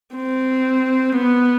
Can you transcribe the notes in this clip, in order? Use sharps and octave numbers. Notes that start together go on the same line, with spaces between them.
C4
B3